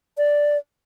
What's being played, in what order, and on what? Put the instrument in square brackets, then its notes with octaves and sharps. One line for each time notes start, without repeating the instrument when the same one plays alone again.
[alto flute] D5